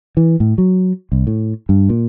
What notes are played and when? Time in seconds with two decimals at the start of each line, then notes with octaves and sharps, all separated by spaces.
0.17 E3
0.40 A2
0.58 F#3
1.12 C2
1.27 A2
1.69 G2
1.89 A#2